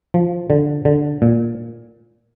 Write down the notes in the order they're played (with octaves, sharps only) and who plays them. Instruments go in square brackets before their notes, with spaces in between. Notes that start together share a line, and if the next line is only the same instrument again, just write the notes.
[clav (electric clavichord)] F3
D3
D3
A#2